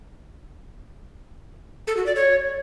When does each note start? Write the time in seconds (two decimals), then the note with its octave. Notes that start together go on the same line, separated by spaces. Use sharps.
1.87 A4
1.97 F#4
2.06 D5
2.15 C#5